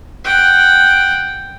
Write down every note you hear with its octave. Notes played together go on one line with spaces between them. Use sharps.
F#5 G5